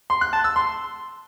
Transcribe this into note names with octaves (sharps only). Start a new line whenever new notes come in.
C6
F#6
A5
E6
C6